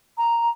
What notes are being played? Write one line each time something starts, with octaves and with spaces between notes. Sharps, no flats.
A#5